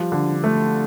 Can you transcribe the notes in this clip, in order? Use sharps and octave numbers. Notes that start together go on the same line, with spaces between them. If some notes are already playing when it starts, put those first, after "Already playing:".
Already playing: F3 G3
D3
A3